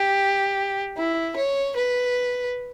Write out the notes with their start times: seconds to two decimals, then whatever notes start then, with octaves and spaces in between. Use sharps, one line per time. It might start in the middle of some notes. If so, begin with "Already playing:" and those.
Already playing: G4
0.97 E4
1.36 C#5
1.76 B4